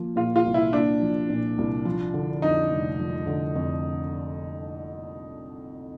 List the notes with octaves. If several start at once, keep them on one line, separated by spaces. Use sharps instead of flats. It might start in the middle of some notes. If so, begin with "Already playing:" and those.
Already playing: F3 A#3
A#2 F4
F4
C2
E4
A#3 D4
F3
A#2
C2
F3
D3
F2 D#4
F1
F3
D3
F2